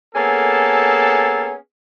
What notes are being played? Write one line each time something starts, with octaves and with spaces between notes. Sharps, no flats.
A#3 B3 C#4 G#4 A4